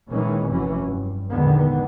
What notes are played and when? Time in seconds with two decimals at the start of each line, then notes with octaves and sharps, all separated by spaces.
0.10 A#2 D#3 E3 G#3 C#4
0.49 F1 F#2 E3 F#3 C#4
0.81 G2
1.30 A#1 E2 G#2 D3 D#3 B3